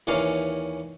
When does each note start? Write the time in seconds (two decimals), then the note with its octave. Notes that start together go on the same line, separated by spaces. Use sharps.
0.07 D#2 E3 C#4 D5 F5 A#5